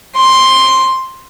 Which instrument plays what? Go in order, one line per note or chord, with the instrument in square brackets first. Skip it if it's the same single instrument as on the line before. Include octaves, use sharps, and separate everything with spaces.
[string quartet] C6